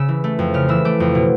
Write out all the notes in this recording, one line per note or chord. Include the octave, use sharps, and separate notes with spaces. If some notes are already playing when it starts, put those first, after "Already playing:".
Already playing: C#3 E6
E3
A3
F2
C#3 F6
E3 E6
A3 D6
F2
B2